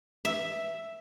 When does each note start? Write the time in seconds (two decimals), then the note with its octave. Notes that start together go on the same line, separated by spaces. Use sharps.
0.25 E5